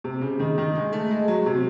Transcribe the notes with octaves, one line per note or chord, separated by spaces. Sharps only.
C3
C#3
D#3
D#3
G#3
A3
G#3
F#3
C3